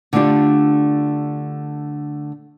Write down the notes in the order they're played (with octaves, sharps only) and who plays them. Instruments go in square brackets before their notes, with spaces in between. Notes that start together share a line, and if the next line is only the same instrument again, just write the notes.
[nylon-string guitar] D3 A3 D4 F4 G4